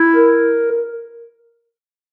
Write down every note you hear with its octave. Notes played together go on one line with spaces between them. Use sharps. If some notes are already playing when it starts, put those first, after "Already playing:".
Already playing: E4
A#4